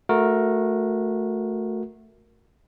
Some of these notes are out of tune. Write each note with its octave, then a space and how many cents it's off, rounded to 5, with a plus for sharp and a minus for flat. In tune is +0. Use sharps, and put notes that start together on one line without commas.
A3 +0 F#4 -20 A#4 +5